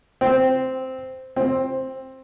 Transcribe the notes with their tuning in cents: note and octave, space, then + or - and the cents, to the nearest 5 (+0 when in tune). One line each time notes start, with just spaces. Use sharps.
C4 -5
C4 +10